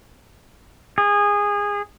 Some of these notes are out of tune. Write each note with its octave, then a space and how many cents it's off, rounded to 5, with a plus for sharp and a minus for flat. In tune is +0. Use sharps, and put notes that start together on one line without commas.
G#4 -20